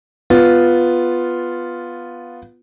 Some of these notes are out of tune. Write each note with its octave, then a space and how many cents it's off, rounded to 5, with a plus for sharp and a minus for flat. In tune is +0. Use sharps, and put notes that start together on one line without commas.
B3 +0 F4 +0